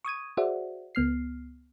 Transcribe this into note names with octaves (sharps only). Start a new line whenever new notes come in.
C#6 D#6 G#6 D#7
F#4 G#4 C5 D5 E5 F#5
C#2 B3 F6 C7